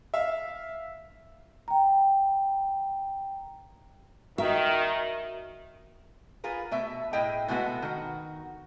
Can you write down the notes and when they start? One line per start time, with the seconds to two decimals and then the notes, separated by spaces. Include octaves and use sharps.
0.14 E5 F5
1.68 G5 A#5
4.38 D#3 F#4 A#4 D#5 E5
6.44 F4 G#4 A#4 B4
6.71 B2 A3 E5
7.13 A2 E4 G#4 D#5 G5
7.48 B2 G#3 A3 B3 F#4 A4
7.82 D#3 F#4